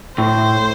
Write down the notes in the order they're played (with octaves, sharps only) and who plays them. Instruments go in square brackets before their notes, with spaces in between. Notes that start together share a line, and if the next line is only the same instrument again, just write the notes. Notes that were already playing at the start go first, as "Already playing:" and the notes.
[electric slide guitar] A2 [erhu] C5